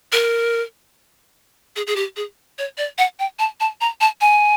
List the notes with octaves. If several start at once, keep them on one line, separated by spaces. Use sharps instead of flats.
A#4
G#4
G#4
G4
G#4
C#5
D5
F#5
G5
A5
A5
A#5
A5
G#5